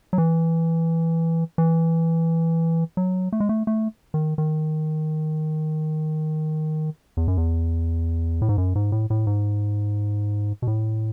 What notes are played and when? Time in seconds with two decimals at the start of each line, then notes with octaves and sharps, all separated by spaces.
0.13 F#3
0.18 E3
1.58 E3
2.97 F#3
3.32 A3
3.40 G#3
3.49 A3
3.67 A3
4.14 D#3
4.38 D#3
7.17 E2
7.28 F#2
7.37 E2
8.42 A2
8.49 G#2
8.58 F#2
8.75 G#2
8.92 A2
9.10 A2
9.27 G#2
10.62 B2
10.67 A2